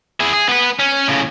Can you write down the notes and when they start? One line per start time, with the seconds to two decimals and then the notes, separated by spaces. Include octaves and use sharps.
0.20 E4 G#4
0.34 G#4
0.49 B3 B4
0.79 C#4
1.07 A2 C#3